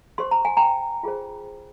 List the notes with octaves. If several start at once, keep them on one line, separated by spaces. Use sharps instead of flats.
G4 C5 C6
A#5
G#5
G5 A#5
F4 G#4 C5